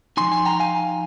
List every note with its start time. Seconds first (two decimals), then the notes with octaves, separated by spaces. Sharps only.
0.17 F3 C4 D#4 G#5 C6
0.32 G#5 C6
0.45 G5 A#5
0.60 F5 G#5